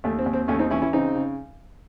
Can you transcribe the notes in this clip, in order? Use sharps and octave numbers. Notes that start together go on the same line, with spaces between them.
D#2 A3
C4
D#2
C4
D#2 A3 C#4
C4 D#4
E3 C#4 E4
C#4 E4
C#3 C4 D#4
C#3